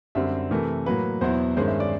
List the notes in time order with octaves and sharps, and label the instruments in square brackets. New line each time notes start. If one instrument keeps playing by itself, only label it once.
[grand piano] F#2 D3 G3 C4 E5
C3 E3 A3 A#4
A2 F#3 A#3 B4
E2 B2 F#3 B3 E4 C5
G2 D#3 G#3 C#4 C5
E5
D5